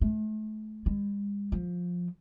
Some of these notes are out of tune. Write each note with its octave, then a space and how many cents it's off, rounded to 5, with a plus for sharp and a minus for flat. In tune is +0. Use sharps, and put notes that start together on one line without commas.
A3 -35
G#3 -45
F3 +15